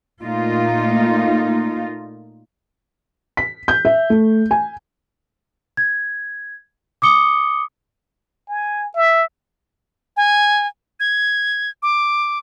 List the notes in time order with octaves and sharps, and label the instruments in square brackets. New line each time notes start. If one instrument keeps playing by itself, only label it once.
[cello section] A#2 A3 A#3 D#4 F4
[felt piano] B6
G6
E5
A3
G#5
[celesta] G#6
D6 D#6 C#7 G7
[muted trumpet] G#5
E5
[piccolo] G#5
G#6
D6